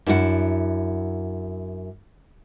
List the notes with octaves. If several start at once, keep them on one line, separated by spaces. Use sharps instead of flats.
F#2 D4 E4 F4 F#5